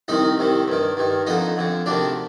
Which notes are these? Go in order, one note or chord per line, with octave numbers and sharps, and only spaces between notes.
C2 C3 D#3 D#4 D#5
C2 C3 D#3
G2 D#3
G2 D#3
F2 D3 D#4 D#5
F2 D3
D2 C3 D#3 D4 D5